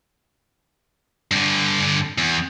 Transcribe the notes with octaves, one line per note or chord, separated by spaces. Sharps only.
G2 D3
E2